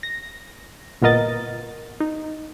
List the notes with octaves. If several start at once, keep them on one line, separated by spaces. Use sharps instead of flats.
A#6
G1 A#2 B3 A#4 D#5 A6
D#4